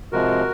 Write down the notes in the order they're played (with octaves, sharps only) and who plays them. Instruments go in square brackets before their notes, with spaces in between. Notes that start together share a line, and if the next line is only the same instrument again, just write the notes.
[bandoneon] C3 F3 G#3 F#4 A#4